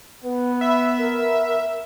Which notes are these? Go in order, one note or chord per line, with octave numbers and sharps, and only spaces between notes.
B3 B4
E5 B5
A#4